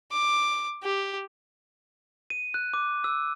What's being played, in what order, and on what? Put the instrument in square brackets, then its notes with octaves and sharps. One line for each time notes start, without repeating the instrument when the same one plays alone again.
[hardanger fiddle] D6
G4
[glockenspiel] D#7
F#6
D6
E6